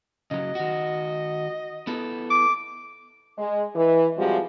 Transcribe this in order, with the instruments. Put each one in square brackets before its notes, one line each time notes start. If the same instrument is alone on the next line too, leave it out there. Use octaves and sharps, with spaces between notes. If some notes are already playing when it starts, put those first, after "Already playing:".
[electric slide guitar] C#3 F#3 [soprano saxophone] D#5
[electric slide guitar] D#3 F#4
B3 E4 A4
[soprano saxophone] D6
[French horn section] G#3
E3
C3 F3 G3 G#3 F#4